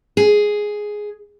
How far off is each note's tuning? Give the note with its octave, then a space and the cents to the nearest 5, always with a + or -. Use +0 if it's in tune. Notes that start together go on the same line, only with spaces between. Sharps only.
G#4 +5